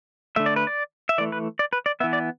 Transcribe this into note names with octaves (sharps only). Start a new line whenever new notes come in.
D3 A3 E5
D5
B4
D5
E5
E3 A3 D5
B4
D5
B4
D5
E3 B3 E5
D5